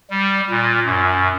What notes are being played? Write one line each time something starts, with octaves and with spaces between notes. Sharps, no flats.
G3
A#2
F#2